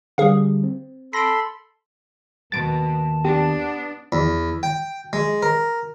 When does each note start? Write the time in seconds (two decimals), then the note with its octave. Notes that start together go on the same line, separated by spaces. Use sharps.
0.18 D3 G3 G#4 F5
0.63 C4
1.13 A4 B5 C6 A#6 D7
2.52 D#2 B2 D#3 A5 A6 D7
3.25 B3 D4 G4
4.12 E2
4.63 G5
5.13 G#3
5.43 A#4